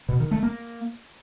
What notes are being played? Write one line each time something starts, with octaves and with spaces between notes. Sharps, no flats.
B2
D#3
A3
A#3